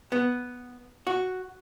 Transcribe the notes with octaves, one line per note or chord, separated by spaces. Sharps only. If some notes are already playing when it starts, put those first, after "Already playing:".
B3
F#4